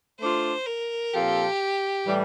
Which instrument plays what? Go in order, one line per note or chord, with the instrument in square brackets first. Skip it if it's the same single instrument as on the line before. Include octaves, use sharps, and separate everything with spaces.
[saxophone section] A3 D4 F4 [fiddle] C5
[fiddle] A#4
[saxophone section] A#2 F3 C4 F4 A4 [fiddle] G4
[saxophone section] A2 E3 G3